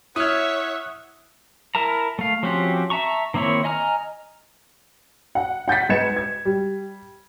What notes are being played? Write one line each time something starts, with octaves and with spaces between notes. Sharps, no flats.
E4 C#5 E5 F#5 D#6 F6 G#6
E4 A#4 A5 A#5
A3 F5
F3 C4 C#4 F#4 G4
E5 A5 A#5 C#6
D#3 A#3 C4 E4 C#5
D#5 G#5 A#5 F6
F#5
F#5 G6 A6 B6
G#2 D#4 B4 G#6 C#7 E7
G#6
G3